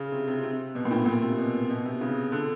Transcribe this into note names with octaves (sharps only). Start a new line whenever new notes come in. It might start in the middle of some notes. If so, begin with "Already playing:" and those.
Already playing: C#3
C3
C3
C3
B2
A#2
A2
A#2
C3
B2
B2
C3
C#3
D3